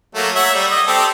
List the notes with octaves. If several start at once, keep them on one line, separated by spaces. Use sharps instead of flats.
F#3 A3 A#3
C#5 E5 F#5
G3
D#5
C4 G4 A4